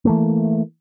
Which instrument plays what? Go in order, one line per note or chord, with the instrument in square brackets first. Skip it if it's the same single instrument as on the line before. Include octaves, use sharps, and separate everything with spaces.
[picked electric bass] E3 A3 A#3